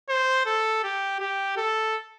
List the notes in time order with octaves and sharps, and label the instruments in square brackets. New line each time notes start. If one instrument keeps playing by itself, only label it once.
[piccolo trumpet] C5
A4
G4
G4
A4